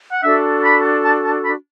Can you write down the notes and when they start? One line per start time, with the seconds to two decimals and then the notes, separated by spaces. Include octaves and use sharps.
0.12 F#5
0.23 D4 F#4 A4 E5
0.64 B5
1.05 A5
1.25 A5
1.45 B5